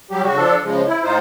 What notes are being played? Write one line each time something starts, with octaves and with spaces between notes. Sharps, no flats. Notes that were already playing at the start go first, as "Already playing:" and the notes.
F#3 G3 G4
C#3 F#4
F3 D4 A4
C#3 F3 G#3
E4
A2 D#4 F4 C5